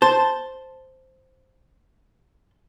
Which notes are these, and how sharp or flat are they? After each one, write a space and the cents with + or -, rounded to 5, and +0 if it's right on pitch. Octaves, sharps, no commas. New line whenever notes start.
C5 +0 A5 +0